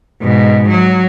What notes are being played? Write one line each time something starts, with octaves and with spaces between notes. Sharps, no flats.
G#2 B2
F#3